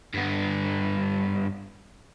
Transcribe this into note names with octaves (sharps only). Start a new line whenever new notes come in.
G2 B3